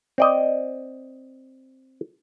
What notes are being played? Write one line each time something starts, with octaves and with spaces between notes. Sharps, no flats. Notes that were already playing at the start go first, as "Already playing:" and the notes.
C4 D5 D#5